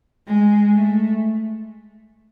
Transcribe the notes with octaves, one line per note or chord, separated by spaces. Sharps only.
G#3
A3